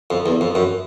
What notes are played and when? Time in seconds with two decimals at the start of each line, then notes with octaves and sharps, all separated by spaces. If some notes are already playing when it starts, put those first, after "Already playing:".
0.11 F2
0.26 E2
0.41 F2
0.55 F#2